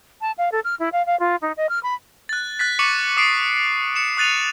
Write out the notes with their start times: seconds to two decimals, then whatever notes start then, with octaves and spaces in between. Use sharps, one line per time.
0.21 A5
0.38 F5
0.52 A4
0.64 F6
0.80 E4
0.93 F5
1.06 F5
1.20 F4
1.42 D#4
1.57 D#5
1.69 F6
1.83 B5
2.29 F#6 A6
2.59 F#6 A6 B6
2.79 C#6 D6 C#7 D#7 F#7
3.17 D6 D#6 C7 D7
3.96 C#7 E7
4.17 D#6 F#6 A6 D#7 F7